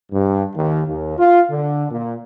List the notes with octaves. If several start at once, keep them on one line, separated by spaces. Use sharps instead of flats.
G2
D#2
D#2
F4
D3
A#2